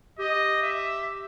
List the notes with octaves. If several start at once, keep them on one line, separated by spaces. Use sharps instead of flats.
G4 D#5
E5